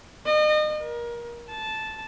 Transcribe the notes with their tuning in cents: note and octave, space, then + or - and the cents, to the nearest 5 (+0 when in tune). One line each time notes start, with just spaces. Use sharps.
D#5 -35
A#4 +25
A5 -10